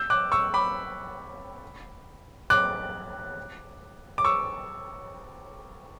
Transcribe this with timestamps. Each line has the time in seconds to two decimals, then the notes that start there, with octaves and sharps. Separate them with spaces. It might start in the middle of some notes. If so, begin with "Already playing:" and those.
Already playing: E6 G6
0.10 D6 F#6
0.32 C#6 E6
0.54 B5 D6
2.50 D6 F#6
4.18 D6
4.25 C#6 E6